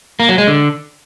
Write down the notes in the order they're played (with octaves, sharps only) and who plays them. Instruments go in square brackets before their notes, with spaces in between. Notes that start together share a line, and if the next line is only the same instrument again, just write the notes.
[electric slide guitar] A#3
F#3
G#3
D3